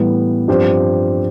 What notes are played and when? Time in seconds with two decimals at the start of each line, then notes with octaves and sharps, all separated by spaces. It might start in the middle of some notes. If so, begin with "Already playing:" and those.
Already playing: A2 E3 G3 B3
0.48 G2 F3 C4 G4 C5